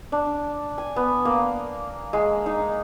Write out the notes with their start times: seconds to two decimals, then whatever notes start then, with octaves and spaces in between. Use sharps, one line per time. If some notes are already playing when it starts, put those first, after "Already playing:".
0.12 D4
0.78 G#5
0.96 B3
1.25 A#3
2.13 G#3
2.46 D#4